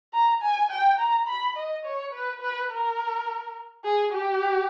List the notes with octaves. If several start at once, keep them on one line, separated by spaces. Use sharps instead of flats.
A#5
G#5
G5
A#5
B5
D#5
C#5
B4
B4
A#4
G#4
G4